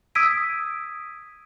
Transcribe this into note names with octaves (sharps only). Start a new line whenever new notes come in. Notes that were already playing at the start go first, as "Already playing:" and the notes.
D#6 E6 G#6 B6 D7 D#7